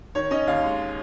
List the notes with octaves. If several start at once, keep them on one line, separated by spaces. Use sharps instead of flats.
D#3 C#5
C#4 D#5
D#2 F5
G#3